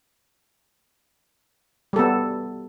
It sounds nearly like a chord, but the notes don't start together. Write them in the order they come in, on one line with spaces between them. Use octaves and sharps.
G3 A4 B3